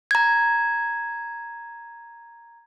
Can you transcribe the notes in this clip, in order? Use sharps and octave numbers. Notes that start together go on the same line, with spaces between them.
A#5 G#6